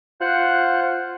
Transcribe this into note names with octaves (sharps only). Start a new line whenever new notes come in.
F4 C5 F#5 F#6